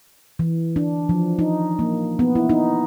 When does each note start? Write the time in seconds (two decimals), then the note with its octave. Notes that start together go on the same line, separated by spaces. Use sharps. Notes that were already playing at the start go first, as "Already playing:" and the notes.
0.39 E3
0.76 D4
1.09 F3
1.39 D#4
1.79 A#3
2.19 B3
2.35 E4
2.49 D#4